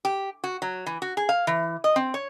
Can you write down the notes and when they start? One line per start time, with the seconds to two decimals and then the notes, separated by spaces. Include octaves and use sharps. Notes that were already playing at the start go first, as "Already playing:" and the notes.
0.05 G4
0.44 F#4
0.62 F#3
0.86 E3
1.02 F#4
1.17 G#4
1.29 F5
1.47 E3
1.84 D#5
1.96 C4
2.14 C#5